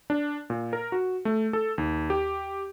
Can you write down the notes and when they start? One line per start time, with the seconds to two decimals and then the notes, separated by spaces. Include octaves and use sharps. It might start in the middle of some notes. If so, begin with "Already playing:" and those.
0.10 D4
0.50 A#2
0.73 A#4
0.92 F#4
1.25 A3
1.53 A4
1.78 D#2
2.10 G4